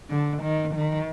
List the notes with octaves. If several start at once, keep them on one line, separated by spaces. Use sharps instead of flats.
D3
D#3
D#3